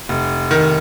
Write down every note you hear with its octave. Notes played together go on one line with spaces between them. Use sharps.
F1
D#3